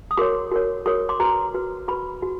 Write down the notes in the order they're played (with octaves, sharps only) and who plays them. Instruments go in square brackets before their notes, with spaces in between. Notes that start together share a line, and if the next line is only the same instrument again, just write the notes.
[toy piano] D#6
F#4 A#4 C#5 C6 D6
F#4 A#4 C#5
F#4 A#4 C#5 C#6 D#6
C6 D6
F#4 B4 A#5 C6
F#4 B4
F#4 B4 B5 C#6
F#4